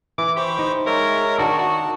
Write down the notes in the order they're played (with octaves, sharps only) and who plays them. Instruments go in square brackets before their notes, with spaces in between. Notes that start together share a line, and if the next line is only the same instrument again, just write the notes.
[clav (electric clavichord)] E3 [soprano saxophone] D6
[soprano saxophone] G4 [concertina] C5 B5 C#6
[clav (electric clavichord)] D#4
[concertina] G#3 C#5 E5 [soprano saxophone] A#4
[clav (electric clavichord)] D#3 D4 [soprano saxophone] F#4 [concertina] A5
[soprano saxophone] F#4